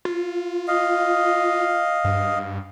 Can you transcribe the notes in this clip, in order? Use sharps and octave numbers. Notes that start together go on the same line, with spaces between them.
F4
D#5 F5
G2